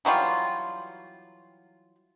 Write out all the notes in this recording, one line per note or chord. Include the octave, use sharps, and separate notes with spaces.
E3 F#3 G3 F4